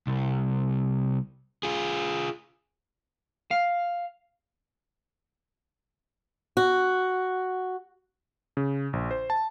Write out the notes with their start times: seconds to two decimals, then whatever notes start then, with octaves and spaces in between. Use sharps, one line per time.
0.07 C2
1.63 F4 G#4
3.51 F5
6.57 F#4
8.57 C#3
8.93 A#1
9.11 C5
9.30 A5